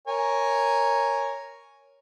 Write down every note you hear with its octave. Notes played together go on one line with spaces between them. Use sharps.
A#4 C#5 G#5